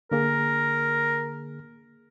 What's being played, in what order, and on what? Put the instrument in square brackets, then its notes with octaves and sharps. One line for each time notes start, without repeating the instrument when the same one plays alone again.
[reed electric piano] D3 A#3 G#4 [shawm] A#4